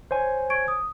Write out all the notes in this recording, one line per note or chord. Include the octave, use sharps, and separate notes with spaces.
C5 C#5 G#5
C#6 G#6 D7
D#6